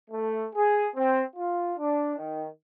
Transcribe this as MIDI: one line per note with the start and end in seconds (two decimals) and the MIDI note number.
0.11 0.46 57
0.56 0.87 68
0.95 1.23 60
1.36 1.74 65
1.79 2.15 62
2.16 2.46 51